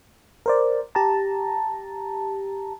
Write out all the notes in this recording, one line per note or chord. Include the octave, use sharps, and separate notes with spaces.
A#4 C5 D5
G4 A5 A#5